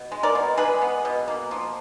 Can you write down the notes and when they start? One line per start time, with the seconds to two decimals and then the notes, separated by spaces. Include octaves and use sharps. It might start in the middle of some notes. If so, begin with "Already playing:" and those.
Already playing: B2
0.12 G#3
0.23 A#4 D5
0.35 B2
0.57 G#3 G#4 B4
0.82 B3
1.05 B2
1.28 A#3
1.51 F3